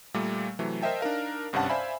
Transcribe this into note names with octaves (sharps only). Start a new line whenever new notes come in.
A#2 G3 A3 A#3
C3 E3 F#3 A3
A#4 C5 D#5 E5 G5 A5
D4 D#4 A#4 F5
G#1 G2 C3 C#4 F#5 A5
C5 D5 E5 F5 G#5 B5